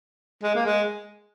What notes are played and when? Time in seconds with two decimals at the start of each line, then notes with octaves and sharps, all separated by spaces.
0.43 G#3
0.55 A#3
0.66 G#3